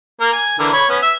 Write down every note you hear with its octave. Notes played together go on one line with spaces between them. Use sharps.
A#3 A#4
G#5
D3 E3 A#4
C#5 B5
B3 C#4
E5